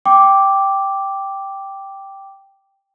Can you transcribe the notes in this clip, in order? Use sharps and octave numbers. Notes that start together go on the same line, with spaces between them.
G5 D6